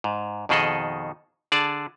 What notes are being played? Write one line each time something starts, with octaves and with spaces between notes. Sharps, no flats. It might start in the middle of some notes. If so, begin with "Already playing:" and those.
G#2
F2 B2 D#3 G#4 A4 D#5
D3 G#4 D5 A5